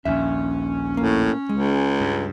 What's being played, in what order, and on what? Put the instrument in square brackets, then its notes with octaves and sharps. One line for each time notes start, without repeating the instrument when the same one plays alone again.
[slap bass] A#1 D#2 [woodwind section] C#4 [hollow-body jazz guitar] E5
[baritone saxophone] A2 [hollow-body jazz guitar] A#3
[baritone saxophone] C#2 [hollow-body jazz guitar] G#3
[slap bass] G2